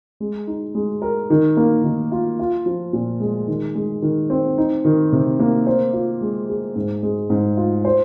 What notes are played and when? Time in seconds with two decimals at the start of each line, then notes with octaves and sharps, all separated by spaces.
0.20 G#3
0.47 D#4
0.75 G#3
1.02 A#4
1.30 D#3
1.57 A#3
1.84 D#3
2.12 F4
2.39 F4
2.66 F3
2.93 A#2
3.20 G#3
3.47 D#3
3.75 G#3
4.02 D#3
4.30 C4
4.58 D#4
4.85 D#3
5.12 C3
5.40 A#3
5.66 C5
5.93 F4
6.21 G#3
6.49 G#4
6.76 G#2
7.03 G#3
7.30 G#2
7.57 F4
7.85 C5